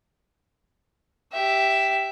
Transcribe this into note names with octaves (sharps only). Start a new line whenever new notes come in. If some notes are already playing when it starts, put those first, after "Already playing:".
G4 E5